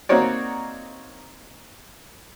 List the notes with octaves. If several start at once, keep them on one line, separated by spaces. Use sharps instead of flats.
A#3 C4 D#4 F#4 C#5 D5